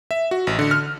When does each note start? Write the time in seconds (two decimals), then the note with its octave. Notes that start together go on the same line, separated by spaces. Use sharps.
0.11 E5
0.31 F#4
0.47 A1
0.59 D3
0.71 F6